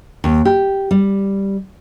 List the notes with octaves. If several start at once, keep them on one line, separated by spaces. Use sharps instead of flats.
D#2
G4
G3